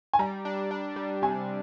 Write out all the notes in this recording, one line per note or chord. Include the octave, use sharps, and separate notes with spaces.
G#5
G3 A#5
D4
D4
G3
C3 G#5